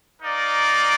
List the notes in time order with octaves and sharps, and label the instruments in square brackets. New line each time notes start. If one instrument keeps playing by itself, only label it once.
[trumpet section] D#4 A#4 D5 F5